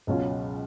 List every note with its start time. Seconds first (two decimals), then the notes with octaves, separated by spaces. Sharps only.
0.07 C#2 B2 F#3 C#4 F4